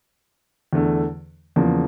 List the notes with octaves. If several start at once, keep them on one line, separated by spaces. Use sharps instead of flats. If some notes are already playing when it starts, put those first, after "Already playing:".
E2 D3 A3
E2 C#3 F3 A#3